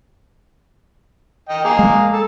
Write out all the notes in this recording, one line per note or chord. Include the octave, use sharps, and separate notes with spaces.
D#5 G5
A#3 G#4
G#3
A4